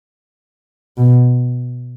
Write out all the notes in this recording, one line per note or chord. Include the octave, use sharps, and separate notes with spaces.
B2